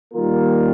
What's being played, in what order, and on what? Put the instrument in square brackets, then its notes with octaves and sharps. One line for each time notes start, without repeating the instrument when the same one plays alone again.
[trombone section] D#3 G3 A#3 F4 A#4